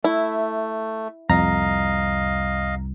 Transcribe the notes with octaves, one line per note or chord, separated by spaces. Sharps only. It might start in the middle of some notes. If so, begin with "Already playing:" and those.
A3 E4
C2 F2 D#5 F5 A#5